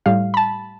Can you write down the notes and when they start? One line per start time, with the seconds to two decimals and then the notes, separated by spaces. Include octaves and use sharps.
0.06 A2 G3 F5
0.34 B5
0.37 A5